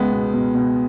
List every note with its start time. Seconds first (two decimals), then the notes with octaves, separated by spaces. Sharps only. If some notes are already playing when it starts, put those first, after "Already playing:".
Already playing: C#2 G#3 B3
0.12 B2
0.34 B2
0.55 B2